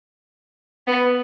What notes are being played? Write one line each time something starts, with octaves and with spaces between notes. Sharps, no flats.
B3